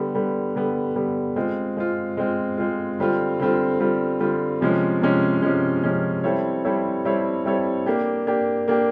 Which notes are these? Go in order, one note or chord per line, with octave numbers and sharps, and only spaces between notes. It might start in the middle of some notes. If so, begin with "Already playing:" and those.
Already playing: D3 G3 B3
D3 G3 B3
D3 G3 B3
D3 G3 B3
G#3 C4 F4
G#3 C4 F4
G#3 C4 F4
G#3 C4 F4
D3 G3 C4 F4
D3 G3 C4 F4
D3 G3 C4 F4
D3 G3 C4 F4
C3 F3 G#3 C#4
C3 F3 G#3 C#4
C3 F3 G#3 C#4
C3 F3 G#3 C#4
G3 C4 E4 A4 C#5
G3 C4 E4 A4 C#5
G3 C4 E4 A4 C#5
G3 C4 E4 A4 C#5
A#3 D4 G4
A#3 D4 G4
A#3 D4 G4